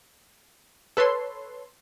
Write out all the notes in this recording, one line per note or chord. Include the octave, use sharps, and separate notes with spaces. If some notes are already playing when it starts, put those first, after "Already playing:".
A4 B4 C#5 C6